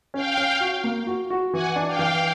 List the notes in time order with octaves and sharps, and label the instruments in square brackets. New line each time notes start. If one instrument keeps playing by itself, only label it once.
[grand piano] C#4 [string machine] F5 G5
[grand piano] C#4
F#4
A#3
F#4
F#4
[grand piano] E3 [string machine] F#5 G#5
[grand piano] D4
[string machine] F5 G5
[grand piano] E3